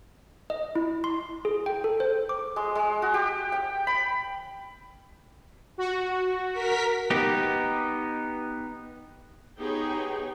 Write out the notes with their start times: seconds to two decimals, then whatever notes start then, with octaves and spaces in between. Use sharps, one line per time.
0.50 D#5
0.75 E4
1.04 C6
1.45 G#4
1.66 G5
1.84 A4
2.00 C5
2.29 D6
2.56 G#3
2.75 G#3
3.02 F#4
3.14 G4
3.52 G5
3.87 B5
5.78 F#4
6.53 A#4 B6
7.10 B3 D#4 G4
9.59 B3 D#4 G4 G#4 C#5 G5